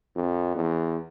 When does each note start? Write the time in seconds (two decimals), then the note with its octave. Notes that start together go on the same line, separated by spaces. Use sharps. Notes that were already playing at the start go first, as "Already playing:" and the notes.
0.16 F2
0.56 E2